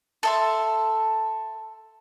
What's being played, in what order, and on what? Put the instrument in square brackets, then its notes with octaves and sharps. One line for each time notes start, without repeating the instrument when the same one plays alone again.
[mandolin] A4 E5 C6